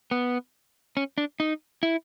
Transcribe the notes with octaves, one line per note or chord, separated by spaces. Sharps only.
B3
C#4
D4
D#4
E4